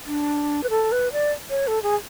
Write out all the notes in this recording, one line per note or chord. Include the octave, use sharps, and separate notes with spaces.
D4
B4
A4
B4
D5
C#5
A4
G#4